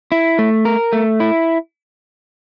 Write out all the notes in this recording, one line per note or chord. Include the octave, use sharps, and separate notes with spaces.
E4
A3
A#4
A3
E4